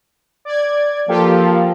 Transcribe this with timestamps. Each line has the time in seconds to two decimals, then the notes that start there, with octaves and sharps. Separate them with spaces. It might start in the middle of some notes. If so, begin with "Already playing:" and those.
0.45 D5 G#6
1.09 F3 A#3 F4 G4 A4